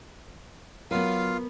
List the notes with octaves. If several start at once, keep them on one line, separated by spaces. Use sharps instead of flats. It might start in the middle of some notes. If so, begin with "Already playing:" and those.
F#3 B3 F4 F#4 A#4 B4 F5